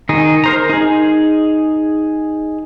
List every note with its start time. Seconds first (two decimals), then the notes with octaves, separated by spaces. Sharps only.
0.09 D#3 D#4 G#4
0.44 A#4 C5 A#5
0.69 D#4 G#4